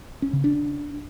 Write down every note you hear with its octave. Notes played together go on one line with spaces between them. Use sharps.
C#4
C#3
D4